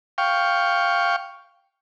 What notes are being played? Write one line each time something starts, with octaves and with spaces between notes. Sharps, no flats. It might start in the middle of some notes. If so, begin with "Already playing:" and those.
F5 G5 C#6